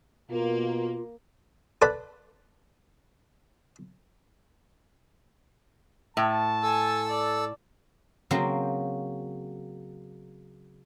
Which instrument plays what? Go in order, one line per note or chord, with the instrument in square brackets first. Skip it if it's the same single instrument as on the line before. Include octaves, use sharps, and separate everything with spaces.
[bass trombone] B2 [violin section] A#3 [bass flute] F4
[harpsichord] A4 B4 D5 F#5 B5
[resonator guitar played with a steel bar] A2 [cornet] A5
[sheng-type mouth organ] A4 E6 [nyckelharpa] G#5
[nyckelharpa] D5
[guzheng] C#3 F#3 A#3 C4 C5